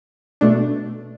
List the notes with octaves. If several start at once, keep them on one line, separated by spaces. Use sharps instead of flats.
B2 A3 D4